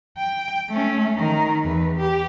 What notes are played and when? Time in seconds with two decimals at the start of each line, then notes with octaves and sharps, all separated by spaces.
0.18 G5
0.69 A3 C#4
1.16 D#3 A#4
1.63 E2 B4
1.97 G4